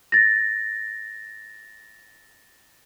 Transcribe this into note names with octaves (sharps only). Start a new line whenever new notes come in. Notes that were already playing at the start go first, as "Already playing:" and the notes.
A6 A#6